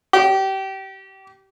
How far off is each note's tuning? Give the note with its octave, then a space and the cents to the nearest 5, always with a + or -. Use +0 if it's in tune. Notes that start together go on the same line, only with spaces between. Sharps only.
G4 -25